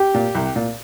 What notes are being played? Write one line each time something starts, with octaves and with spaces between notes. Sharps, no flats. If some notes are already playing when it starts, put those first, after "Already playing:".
Already playing: G4
A#2
C2
A#2